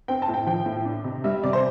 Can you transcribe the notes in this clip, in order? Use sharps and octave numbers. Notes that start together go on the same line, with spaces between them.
C4 G5
A5
A2
G5
F3 G5
A2
D4
C3
G3 E5
C3 D5
C5